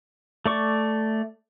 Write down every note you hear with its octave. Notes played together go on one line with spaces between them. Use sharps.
A3 D5 C#6